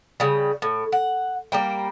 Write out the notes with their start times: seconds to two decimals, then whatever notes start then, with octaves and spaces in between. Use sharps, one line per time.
0.20 C#3 G3
0.62 A2
0.92 F#5
1.52 G3 A#3 G5